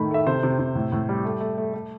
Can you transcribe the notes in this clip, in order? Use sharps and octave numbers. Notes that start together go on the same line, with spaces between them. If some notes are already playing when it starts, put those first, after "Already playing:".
Already playing: A2 D#3 A3 B5
A3 E5
C3 C5
C3
C3
A2
A2
G3
A3
A3
A3
A3